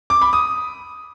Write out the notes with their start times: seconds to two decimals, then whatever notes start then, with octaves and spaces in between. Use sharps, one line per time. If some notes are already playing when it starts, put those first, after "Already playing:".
0.10 D6
0.21 B5
0.33 D#6